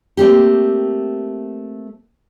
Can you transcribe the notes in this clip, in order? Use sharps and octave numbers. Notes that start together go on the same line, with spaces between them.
A3 A#3 C4 G4